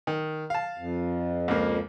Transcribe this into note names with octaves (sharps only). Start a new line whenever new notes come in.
D#3
F5 A5
F2
C#2 A#3